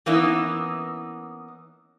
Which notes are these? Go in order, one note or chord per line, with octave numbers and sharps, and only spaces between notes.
E3 A#3 B3 C#4 D#4 E4